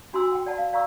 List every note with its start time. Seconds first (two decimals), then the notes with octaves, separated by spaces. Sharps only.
0.13 D4 F#4 G#5 C6 E6
0.32 F#5 G5
0.46 D5 F#5 A5
0.58 F5
0.73 D5 F5 A#5 C#6 E6